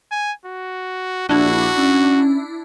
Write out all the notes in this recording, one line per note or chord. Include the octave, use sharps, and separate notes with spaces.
G#5
F#4
A#1 D4 E4 F#4
C#4